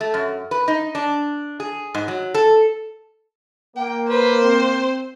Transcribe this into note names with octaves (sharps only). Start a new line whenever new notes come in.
A3
F#2
B4
D#4
D4
G#4
G#2
F#3
A4
A#3 G5
B4 C5
C4